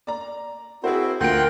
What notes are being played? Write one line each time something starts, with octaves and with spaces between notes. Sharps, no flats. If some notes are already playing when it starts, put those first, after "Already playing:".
D5 A#5
C4 E4 F#4 G#4 C5
D2 F3 A#4 F#5 G5 C6 F#6 D7